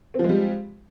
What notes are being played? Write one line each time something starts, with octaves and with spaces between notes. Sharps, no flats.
F3 G3 G#3 C4